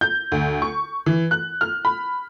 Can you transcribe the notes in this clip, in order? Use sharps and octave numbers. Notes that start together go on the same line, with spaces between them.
G6
D2
C#6
E3
F#6
F6
B5